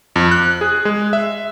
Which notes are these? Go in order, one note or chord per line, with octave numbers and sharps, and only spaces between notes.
F2
F#6
G#4
G#3
E5